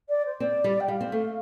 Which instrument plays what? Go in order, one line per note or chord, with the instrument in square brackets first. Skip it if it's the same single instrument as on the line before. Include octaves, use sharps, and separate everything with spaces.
[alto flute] D5
C5
[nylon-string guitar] C4 [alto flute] D5
[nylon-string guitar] G3
[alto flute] G5
[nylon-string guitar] G3 [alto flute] F5
[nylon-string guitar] C4
A3